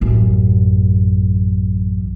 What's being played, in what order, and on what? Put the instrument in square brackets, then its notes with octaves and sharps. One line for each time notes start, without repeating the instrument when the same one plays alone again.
[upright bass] A1 F#2